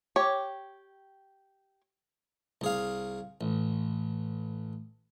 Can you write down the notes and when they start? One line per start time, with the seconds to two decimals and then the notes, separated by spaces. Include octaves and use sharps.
0.16 G4 C#5
2.61 C2 G#4 F5
3.41 A1